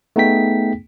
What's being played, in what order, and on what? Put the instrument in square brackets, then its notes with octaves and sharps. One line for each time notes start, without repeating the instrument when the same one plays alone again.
[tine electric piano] A3 B3 D#4 G#4 G5 B6